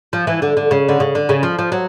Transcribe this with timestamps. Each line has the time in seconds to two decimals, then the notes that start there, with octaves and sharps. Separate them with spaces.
0.13 F3
0.27 E3
0.42 D3
0.57 D3
0.71 C#3
0.89 D3
1.00 C#3
1.15 D3
1.29 C#3
1.43 F3
1.59 F3
1.72 F#3